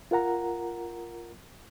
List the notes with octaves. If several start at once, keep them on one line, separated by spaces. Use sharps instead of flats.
F4 A#4 F#5 A#5